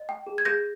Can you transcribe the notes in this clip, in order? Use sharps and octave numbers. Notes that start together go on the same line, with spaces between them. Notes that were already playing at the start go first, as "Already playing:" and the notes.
Already playing: D#5
G5
G#4
G#6
G#4 G6 A#6